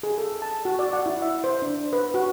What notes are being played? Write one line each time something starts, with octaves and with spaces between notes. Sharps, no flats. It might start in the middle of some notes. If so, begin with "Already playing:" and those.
G#4
A4
A5
F#4
D5
F#5
E4
E5
C5
D4
B4
F#4